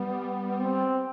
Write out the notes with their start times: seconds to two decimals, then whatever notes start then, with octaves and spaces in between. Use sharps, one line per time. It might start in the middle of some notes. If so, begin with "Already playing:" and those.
Already playing: G3 B3
0.60 C4